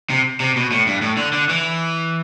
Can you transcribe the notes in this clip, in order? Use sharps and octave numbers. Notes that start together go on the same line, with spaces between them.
C3
C3
B2
A2
G2
A2
D3
D3
E3